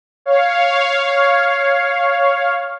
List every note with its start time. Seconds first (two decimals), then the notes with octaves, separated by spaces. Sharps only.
0.26 C#5 F5